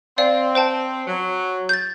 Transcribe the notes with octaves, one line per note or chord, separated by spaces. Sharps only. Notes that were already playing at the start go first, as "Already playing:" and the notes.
C4 D5 F5
C5 G5 A5
F#3
G6 A6